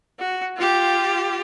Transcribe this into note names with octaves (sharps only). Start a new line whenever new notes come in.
F#4
F4 G4